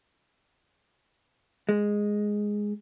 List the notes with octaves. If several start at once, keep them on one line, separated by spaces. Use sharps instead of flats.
G#3